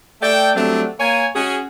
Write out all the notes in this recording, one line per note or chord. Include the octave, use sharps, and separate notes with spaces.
A3 A4 D5 G5
F#3 G3 A3 C4 D4
A#3 C#5 G#5
C#4 F#4 G#4